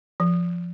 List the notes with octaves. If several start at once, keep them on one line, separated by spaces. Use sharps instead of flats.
F3